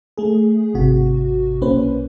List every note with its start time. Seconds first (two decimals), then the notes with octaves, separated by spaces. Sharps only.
0.18 A3 G#4
0.74 G#1 C3 F#4
1.61 B1 A#3 C#4 B4 C5